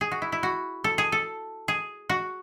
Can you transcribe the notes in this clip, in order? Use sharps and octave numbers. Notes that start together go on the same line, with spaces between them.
G#4
F#4
E4
E4
F#4
A4
G#4
A4
G#4
F#4